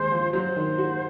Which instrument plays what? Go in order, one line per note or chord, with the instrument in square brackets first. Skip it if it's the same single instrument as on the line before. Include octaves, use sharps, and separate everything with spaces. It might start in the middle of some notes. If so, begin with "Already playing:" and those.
Already playing: [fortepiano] D#2 G#3 [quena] C5
[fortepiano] F3
[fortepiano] F#3 [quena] C5
[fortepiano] D#3
F#4